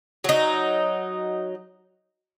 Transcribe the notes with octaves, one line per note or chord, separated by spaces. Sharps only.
F#3 D#4